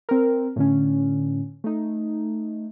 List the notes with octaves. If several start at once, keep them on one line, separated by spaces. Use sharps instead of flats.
C4 A#4
A2 D3 C#4
A3 D#4